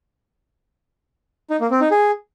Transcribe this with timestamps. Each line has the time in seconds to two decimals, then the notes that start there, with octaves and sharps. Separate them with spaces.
1.50 D#4
1.60 A#3
1.71 C4
1.81 D#4
1.91 G#4